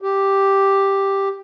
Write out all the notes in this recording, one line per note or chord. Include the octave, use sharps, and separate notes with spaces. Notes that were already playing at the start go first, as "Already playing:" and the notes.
G4